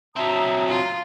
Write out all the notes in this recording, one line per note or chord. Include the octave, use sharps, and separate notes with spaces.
F#3 C4 E5 A5 A#5 D#6
F4